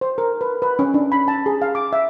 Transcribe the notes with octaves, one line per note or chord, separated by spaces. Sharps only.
C5
A#4
B4
B4
C#4
D4
B5
A5
G#4
F5
D6
E5